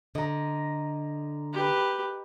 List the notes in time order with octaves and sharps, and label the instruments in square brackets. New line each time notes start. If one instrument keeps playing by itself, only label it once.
[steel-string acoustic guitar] D3 [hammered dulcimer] D#5 A#5
[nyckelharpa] G4 B4